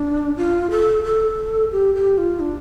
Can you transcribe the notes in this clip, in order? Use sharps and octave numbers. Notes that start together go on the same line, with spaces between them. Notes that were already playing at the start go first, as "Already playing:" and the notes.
Already playing: D4
F4
A4
A4
G4
G4
F4
D4